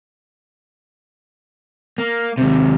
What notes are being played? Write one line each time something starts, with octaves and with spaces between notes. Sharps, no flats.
A#3
D#2 C3